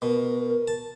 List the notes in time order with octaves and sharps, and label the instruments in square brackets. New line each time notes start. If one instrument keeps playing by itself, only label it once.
[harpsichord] B2 [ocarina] A#4
[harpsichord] A5